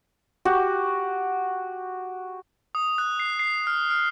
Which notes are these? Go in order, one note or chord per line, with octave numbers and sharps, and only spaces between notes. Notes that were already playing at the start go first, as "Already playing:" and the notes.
F#4 G4
D#6
F#6
C7
C7
F6
F6